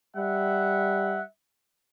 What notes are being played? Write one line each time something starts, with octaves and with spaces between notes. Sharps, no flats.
G3 E5 F#5